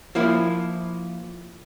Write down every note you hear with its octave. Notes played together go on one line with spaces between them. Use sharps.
F3 A#3 E4